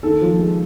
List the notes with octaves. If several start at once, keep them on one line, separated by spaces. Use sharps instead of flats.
D#2 A4
F3
G#3